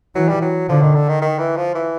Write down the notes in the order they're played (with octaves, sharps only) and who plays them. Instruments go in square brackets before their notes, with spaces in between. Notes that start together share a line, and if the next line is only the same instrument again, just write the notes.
[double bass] E3 [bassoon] F#3
[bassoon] G3
F#3
[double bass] D3 [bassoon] F3
[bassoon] D#3
D3
D#3
D#3
E3
F3
E3